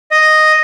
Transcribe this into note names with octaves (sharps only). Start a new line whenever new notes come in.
D#5